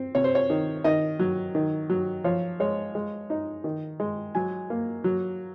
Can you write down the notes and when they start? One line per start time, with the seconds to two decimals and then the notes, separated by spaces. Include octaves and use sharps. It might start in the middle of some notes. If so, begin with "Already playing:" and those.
Already playing: C4
0.15 C3 C#5
0.24 C5
0.35 C#5
0.50 D#3
0.84 D#3 D#5
1.19 F#3
1.55 D#3
1.90 F#3
2.24 F3 C#5
2.60 G#3 C#5
2.95 G#3
3.30 D#4
3.64 D#3
4.00 G#3
4.35 F#3 G#5
4.70 A#3
5.04 F#3